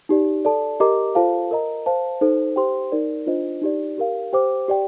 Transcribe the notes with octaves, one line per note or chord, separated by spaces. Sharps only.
D#4 G4 D5
A4 D5 A5
G4 A#4 D#5 A#5 D6
F4 A4 C5 F5 A5
A#4 D#5 A#5
C5 F5 A5
D#4 A4 C5
G4 C5 G5 C6
D#4 A#4 D5
D4 F4 C5 D#5
D#4 G4 D5
G4 A#4 F5
G4 C5 G5 D6
G4 D5 G5